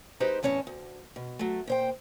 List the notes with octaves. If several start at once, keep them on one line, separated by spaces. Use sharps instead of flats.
G#3 D#4 G4 B4 C5
E2 A2 C#4 C#5 A5
D2
B2
F#3 A3
A#2 C5 G5